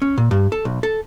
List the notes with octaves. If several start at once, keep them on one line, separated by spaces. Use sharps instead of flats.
C#4
A#2
G2
A4
B1
A4